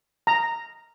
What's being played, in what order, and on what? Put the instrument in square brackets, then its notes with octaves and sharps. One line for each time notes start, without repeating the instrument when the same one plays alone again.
[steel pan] A#5